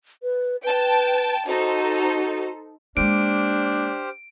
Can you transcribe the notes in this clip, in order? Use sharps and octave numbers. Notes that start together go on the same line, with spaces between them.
B4
B4 G5 A5
D#4 F#4 A4 C5
G#3 A#3 D4 G4 C5 F6 D7